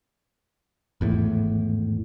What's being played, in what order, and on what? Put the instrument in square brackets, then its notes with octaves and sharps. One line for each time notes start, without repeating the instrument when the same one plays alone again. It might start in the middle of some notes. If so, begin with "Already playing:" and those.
[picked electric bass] G#1 E2 A2